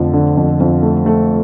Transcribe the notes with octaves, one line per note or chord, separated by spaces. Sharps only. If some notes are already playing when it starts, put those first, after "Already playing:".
Already playing: F2 D3 F3 A3
D3
F2
F2
A3
A3